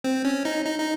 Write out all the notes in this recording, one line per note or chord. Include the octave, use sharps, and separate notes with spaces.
C4
C#4
D#4
D#4
D#4